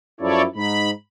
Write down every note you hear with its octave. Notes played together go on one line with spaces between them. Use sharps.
F#2 F3 E4 A4 C#5 D5
G#2 D#4 B5